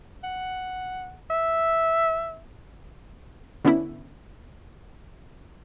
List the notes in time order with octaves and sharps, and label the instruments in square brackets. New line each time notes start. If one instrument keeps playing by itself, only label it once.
[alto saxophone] F#5
E5
[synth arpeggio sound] D3 B3 C#4 D4 E4